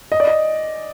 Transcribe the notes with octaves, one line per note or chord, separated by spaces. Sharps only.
D#5
D5
D#5